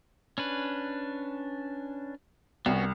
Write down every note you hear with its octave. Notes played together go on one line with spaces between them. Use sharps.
C#4 D4 B4
C2 B3 C#4 F#4